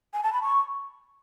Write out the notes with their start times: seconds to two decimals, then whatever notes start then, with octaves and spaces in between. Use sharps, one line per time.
0.14 G#5
0.23 A5
0.33 B5
0.42 C#6